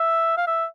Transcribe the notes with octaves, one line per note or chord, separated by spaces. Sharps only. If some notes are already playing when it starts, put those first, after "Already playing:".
Already playing: E5
F5
E5